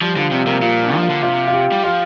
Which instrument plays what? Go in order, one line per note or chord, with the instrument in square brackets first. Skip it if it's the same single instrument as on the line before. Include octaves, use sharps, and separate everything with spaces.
[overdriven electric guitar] F3 [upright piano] G3
[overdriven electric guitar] D3 [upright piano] F3
[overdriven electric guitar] C3 [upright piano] G3
[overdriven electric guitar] C3 [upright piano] A#3
[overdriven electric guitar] A#2 [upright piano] F4
[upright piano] D4
[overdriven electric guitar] F3
[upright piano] F4
[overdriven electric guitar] D3
[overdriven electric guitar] C3 [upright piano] F4
[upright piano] F4
G4
[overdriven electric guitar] G3
[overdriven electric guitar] F3 [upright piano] F4